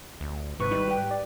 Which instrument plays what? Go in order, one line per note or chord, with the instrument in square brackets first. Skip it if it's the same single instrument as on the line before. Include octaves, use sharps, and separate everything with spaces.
[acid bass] D2
[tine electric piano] G#1 G#2 C#6 [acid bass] C3 [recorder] B4
[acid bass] G3 [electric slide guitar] D#4
[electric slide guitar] G4 G5
[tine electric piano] D5